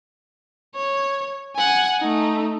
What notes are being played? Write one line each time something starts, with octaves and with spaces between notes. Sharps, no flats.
C#5
F#5 G#5
A3 D#4